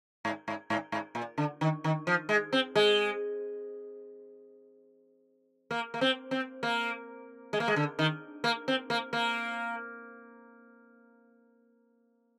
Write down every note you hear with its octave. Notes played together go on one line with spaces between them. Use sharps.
G#2
G#2
G#2
G#2
A#2
D3
D#3
D#3
F3
G#3
C4
G#3
A#3
A#3
C4
C4
A#3
G#3
A#3
G#3
D3
D#3
A#3
C4
A#3
A#3